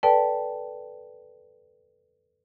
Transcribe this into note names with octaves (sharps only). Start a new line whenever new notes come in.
A4 B4 D5 G5 A5